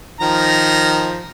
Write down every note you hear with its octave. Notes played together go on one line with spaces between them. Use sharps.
D#3 F3 A#5